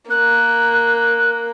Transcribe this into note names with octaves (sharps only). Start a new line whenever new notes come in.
A#3 F#6